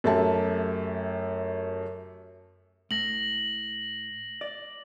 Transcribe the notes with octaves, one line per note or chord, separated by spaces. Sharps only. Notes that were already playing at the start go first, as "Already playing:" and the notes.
F#2 A3 G4 E5 A5
A2 A#6 F#7
D5